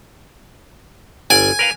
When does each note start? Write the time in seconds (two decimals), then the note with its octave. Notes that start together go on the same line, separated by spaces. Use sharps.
1.30 G1 D5 G#5
1.59 A#4 B4 F5